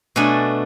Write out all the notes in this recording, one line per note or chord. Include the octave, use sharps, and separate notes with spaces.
B2 A3 D4 G#5